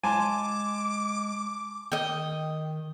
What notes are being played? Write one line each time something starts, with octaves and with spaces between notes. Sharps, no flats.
G#3 G#5 A5 C6 D6
D#3 D#5 G5